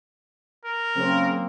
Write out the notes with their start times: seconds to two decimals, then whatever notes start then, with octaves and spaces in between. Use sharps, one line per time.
0.65 A#4
0.97 C#3 F#3 A#3 C4